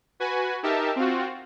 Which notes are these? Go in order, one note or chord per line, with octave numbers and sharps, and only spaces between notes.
F#4 B4 G#5
D#4 G4 A#4 E5 A5
C4 F4 F#4